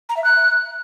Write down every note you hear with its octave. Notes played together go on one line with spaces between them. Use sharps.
A#5
E5
F#6